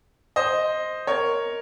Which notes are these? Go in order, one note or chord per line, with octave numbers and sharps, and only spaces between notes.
C5 D#5
A#4 C#5